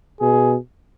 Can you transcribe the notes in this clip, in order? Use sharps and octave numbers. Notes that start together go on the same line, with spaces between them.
B2 G#4